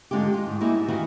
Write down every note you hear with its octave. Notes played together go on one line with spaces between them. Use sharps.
G#2 D3 G#3 F4 G4
F4
G#2
A#3 D#4 E4 F#4 G#4
G3
D#3 E3 F#4 B4 F5